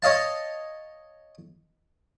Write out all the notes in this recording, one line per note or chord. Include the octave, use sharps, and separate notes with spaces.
C#5 D#5 F5 A5